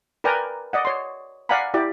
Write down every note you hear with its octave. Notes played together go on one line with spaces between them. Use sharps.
A#4 B4 D5 G5 G#5 A#5
D5 D#5 F#5
C#5 C6
D5 F5 F#5 G#5 A#5 B5
E4 G4 D5